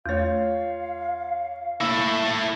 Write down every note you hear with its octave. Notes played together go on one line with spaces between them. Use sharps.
E2 A3 F4 C#5 F5
A3 A#3 E4 E6